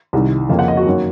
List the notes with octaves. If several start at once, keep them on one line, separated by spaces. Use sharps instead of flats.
C2 C3 D#3
F2 C#3 F3 A#3 F5
F#5
D#5
F#4
F#2 D#3 F#3 A#3